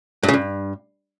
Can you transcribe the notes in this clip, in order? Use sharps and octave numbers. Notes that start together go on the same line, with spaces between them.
G2
C#3
G2